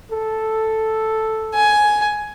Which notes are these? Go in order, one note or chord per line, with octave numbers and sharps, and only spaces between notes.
A4
G#5